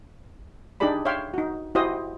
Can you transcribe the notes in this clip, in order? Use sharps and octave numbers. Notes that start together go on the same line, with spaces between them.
D4 D#4 G4 G#4 D5 B5
C#5 E5 F5 G5 C6
D#4 F#4
E4 F#4 G4 C5 D#5 D#6